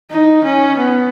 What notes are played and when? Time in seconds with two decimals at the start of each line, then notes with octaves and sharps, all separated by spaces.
0.11 D#4
0.44 C#4
0.78 B3